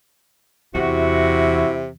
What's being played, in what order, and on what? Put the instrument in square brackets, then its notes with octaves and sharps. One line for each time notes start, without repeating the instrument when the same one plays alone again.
[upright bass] E2 [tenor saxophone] C3 [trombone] E4 [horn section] F#4